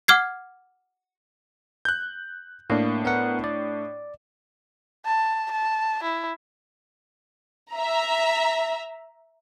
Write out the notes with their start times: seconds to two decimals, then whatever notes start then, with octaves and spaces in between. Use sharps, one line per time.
0.08 F#5 D6 F6 G#6 C7
1.85 F#6 G6
2.70 A2 A#3 D4
3.05 B3 A#4 F#5
3.44 D5
5.05 A5
5.51 A5
6.03 E4
7.73 E5 A#5